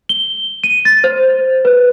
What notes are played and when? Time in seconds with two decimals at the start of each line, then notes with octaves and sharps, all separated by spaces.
0.09 G7
0.64 D#7
0.85 A6
1.04 C5
1.65 B4